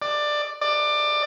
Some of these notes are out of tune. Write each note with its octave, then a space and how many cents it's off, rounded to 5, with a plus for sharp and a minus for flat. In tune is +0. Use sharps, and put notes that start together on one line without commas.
D5 +15
D5 +20